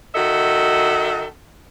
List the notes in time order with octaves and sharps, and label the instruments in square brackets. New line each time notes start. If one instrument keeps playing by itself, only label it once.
[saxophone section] D#3 F#4 A4 D#5 E5